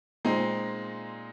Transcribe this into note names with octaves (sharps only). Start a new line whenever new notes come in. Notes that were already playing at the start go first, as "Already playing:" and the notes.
A#2 G#3 C4 D#4